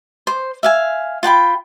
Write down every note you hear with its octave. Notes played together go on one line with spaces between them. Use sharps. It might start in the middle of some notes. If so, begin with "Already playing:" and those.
C5
E5 F5 G#5
F4 F#5 G5 B5